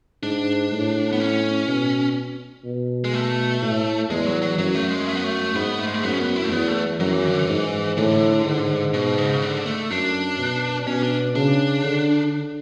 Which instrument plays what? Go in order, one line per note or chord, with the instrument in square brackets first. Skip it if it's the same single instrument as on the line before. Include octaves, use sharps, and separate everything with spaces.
[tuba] G#2 [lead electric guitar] D4
[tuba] A2
[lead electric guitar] B3
C#4
[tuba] B2
B2
[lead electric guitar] G#3
A3
[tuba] A2
[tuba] E2 [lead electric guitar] G#3
[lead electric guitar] F#3
F#3
[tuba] F#2 [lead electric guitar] F#3
[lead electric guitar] A3
G#3
A3
B3
A3
[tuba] G#2 [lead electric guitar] B3
[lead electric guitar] A3
G#3
A3
[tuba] F#2 [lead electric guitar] B3
[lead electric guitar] C#4
B3
E4
A3
[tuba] E2 [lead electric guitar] B3
[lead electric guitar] A3
[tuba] F#2 [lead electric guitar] F#3
[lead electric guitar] E3
D3
E3
[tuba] G#2
[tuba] A2 [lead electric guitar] D3
[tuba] G#2
[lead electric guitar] B2
C#3
D3
A3
[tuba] F#2 [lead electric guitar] D4
[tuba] B2
[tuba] B2 [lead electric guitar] C#4
[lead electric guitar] D4
[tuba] C#3 [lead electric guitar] D4
[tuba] D3